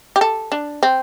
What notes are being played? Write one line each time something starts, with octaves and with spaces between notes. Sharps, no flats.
G4
A4
D4
C4